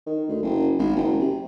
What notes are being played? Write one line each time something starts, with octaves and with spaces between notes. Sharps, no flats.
D#3
D2
F#1
G#1
F#1
C3